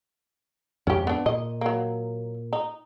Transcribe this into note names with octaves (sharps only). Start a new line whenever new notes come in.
F2 G#2 B2 C#4 G4
B3 D4
A#2 D#5
F#3 A#3
D#4